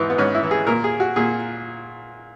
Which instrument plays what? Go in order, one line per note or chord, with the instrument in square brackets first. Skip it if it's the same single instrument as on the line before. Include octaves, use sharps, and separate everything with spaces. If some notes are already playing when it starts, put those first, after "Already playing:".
Already playing: [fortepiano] G#2 E3
B3
G#2 C#4
E4
E3
G#4
A#2 A#4
G#4
F#4
A#2 G#4